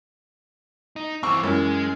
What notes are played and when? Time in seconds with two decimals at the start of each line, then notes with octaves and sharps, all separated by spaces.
0.96 D#4
1.23 E3 C4 C#6 D6 E6
1.43 F#2 E3 G#3